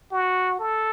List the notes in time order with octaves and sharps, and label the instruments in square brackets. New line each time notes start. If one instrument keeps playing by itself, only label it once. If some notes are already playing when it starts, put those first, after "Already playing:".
[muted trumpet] F#4
A4